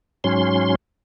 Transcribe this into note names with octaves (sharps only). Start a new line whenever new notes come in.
G#2 F#3 C#4 C6